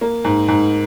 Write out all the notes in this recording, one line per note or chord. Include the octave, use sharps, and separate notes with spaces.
A#3
G#2
G#2